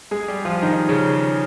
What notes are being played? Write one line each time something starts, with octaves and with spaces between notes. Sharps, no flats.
G#3 G#4
G3 G4
F3 F4
D#3 D#4
C#3 C#4